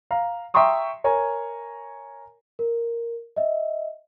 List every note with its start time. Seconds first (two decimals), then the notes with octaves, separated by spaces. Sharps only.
0.11 F5 A#5
0.54 E5 G5 A#5 C6 C#6 D#6
1.04 A#4 C#5 G#5 A#5
2.59 A#4
3.36 D#5 E5